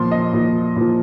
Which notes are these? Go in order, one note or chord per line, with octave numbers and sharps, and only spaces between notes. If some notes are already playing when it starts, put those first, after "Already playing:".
Already playing: A#2 F3 C6
D#5
A#2 F3
A#2 F3